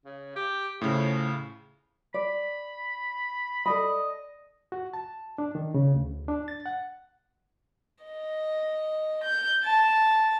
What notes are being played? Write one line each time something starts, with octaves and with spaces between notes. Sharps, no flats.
C#3
G4
A2 C#3 F3
D5 B5
A4 D5 D#5 B5
F#4
A5
D4
D#3
C#3
D2
D4
A6
F#5
D#5
G6
A5